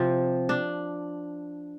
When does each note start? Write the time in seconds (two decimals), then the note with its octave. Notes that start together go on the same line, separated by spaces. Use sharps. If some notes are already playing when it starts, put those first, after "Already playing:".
Already playing: C3 F3
0.49 D4